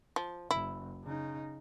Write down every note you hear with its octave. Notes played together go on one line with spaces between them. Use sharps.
F3
F#1 E4
C#3 D#4